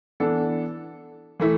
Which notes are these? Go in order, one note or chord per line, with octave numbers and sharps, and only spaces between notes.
E3 B3 D4 A4
E3 A3 E4